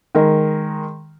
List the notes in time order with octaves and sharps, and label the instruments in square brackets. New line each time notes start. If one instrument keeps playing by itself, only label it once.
[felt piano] D#3 G#3 A#4